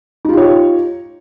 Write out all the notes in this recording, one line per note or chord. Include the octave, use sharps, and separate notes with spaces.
D#4 F4 G4 C#5